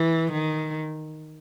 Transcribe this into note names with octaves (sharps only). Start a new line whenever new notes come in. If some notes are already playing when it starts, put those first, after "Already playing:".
Already playing: E3
D#3